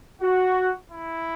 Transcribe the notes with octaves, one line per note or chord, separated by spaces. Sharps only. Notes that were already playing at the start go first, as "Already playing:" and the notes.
F#4
E4